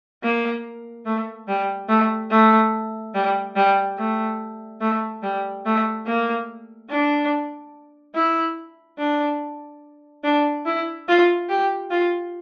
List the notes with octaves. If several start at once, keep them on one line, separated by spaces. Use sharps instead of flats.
A#3
A3
G3
A3
A3
G3
G3
A3
A3
G3
A3
A#3
D4
E4
D4
D4
E4
F4
G4
F4